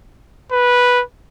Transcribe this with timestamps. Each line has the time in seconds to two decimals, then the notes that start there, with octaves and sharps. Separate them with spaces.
0.52 B4